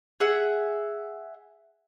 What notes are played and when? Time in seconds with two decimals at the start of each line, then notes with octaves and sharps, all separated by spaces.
0.20 G#4 E5 F#5